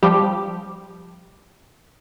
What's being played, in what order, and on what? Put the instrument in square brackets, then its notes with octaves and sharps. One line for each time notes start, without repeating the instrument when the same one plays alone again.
[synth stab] F3 G3 G4